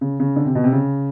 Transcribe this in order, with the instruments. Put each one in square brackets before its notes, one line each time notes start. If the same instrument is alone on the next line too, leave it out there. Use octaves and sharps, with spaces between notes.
[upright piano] C#3
C#3
D3
C3
B2
C3
C#3